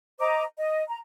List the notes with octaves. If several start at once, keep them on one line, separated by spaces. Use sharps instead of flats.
C5 D#5 A#5 D6
D#5
A#5